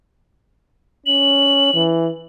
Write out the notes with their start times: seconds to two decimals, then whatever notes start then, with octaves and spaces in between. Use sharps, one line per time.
1.06 C#4 F#7
1.74 E3